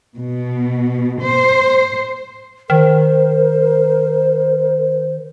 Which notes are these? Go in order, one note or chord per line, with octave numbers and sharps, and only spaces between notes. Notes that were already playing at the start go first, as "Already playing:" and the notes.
B2
C5
D#3 A#4 C5